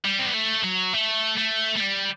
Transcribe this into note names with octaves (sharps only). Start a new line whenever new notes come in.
G3
C4
B3
A3
F#3
A3
A3
A3
G3